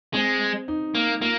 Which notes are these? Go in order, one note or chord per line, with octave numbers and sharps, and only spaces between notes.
G#3 C4
D#4
A#3
A#3 F4